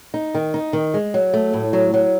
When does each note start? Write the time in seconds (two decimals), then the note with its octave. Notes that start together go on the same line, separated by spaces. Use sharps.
0.14 D#4
0.35 D#3
0.54 D#4
0.73 D#3
0.94 G#3
1.14 F#3
1.34 A3
1.53 A2
1.73 F#3
1.94 F#3